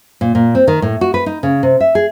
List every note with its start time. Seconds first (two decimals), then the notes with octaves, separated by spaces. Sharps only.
0.21 A#2
0.35 A#2
0.55 C4
0.68 D#3
0.82 A2
1.01 F#4
1.14 B4
1.26 D#4
1.43 C#3
1.63 C3
1.80 E5
1.95 G#4